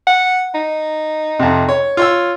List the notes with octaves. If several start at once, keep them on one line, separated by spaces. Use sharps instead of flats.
F#5
D#4
F2 C3
C#5
F4 C#5 E6